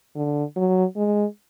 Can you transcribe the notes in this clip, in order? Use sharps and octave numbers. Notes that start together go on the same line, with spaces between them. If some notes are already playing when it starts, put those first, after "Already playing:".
D3
F#3
G#3